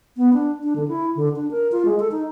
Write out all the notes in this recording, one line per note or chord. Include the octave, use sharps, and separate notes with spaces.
B3
D4
D4
D3
E4
D3
D4
A#4
F4
G#3
A4
D#4